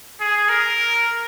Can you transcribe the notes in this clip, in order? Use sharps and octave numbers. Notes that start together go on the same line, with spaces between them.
G#4
A#4